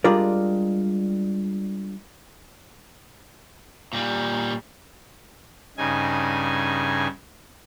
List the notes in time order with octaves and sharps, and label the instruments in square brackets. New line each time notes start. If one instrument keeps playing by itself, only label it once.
[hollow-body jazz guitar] G3 G#3 D4 F4 A#4 D5
[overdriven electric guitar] A#2 G3
[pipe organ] G2 C#3 D#4 G#5